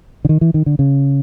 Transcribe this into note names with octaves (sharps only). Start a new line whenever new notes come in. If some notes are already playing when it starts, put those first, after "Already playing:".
D3
D#3
E3
D#3
D3
C#3